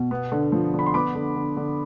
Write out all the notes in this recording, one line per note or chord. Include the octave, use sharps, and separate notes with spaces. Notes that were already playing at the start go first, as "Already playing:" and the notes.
Already playing: B2
B3
D3
F3
D3 B5
C6
B3 B5 D6
D3
D3
D3